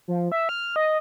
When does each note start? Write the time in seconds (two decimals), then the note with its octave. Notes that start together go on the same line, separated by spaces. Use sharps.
0.08 F3
0.32 E5
0.49 F6
0.76 D#5